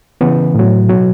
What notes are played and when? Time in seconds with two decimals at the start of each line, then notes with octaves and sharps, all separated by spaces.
0.21 C#3 E3 B3
0.55 A2 F#3
0.89 B2 F#3